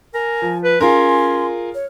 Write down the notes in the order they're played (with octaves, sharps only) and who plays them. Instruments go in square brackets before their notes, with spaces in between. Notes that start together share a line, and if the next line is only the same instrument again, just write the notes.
[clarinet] A#4 [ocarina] G#5
[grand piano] F3
[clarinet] B4
[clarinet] C#4 [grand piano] F4 G#4 A#4 [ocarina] C6
[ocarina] C#5